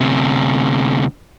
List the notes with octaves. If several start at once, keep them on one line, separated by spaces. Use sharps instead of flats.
D2 C3